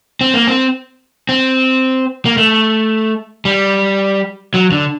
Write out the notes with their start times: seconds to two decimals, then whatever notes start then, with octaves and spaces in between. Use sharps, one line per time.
0.21 C4
0.34 A#3
0.47 C4
1.29 C4
2.26 A#3
2.37 A3
3.45 G3
4.54 F#3
4.72 D3